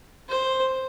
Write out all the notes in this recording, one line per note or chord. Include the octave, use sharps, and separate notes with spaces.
C5